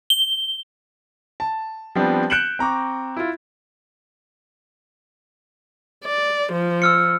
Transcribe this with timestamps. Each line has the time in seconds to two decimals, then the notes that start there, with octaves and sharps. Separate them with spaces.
0.10 G7
1.40 A5
1.95 F3 G3 B3 C4 D4
2.30 F#6 G6 C#7 D7 E7 F#7
2.59 C4 A#5 C#6 D6
3.17 E4 F4
6.06 D5
6.52 F3
6.82 E6 F6 C#7